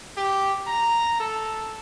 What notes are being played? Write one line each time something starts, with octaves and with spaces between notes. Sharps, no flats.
G4
A#5
A4